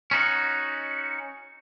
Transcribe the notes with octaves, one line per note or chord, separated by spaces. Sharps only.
C#4 D#4 F#4